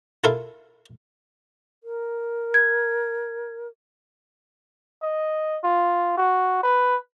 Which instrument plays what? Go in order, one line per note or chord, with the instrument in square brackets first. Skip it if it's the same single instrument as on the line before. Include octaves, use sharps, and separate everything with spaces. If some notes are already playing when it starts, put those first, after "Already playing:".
[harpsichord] E4 F4 A4 A#4 F5
[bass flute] A#4
[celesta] G#6
[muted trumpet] D#5
F4
F#4
B4